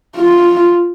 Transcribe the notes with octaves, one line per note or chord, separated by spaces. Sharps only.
F4